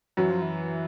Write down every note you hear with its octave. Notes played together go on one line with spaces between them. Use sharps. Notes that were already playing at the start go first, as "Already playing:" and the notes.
F#2 E3 F#3
F3
E3